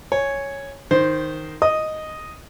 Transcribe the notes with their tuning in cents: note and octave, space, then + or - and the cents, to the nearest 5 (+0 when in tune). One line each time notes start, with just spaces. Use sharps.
C#5 +0 G#5 +0
D#3 +0 C5 +0
D#5 +0 D#6 +0